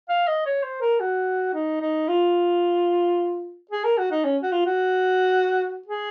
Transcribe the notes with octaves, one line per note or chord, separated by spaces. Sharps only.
F5
D#5
C#5
C5
A#4
F#4
D#4
D#4
F4
G#4
A#4
F#4
D#4
C#4
F#4
F4
F#4
G#4